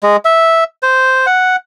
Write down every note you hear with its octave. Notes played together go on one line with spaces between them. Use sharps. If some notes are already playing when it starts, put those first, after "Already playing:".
G#3
E5
C5
F#5